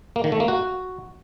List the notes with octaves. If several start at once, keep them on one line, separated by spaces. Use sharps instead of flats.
A#3
D#3
A3
A#3
F#4